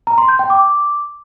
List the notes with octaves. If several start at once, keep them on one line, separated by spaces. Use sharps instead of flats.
A#5
C6
G6
G5
D6